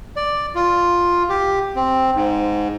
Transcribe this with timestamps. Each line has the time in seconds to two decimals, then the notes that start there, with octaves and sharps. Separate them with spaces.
0.17 D5
0.55 F4
1.29 G4
1.76 C4
2.15 G#2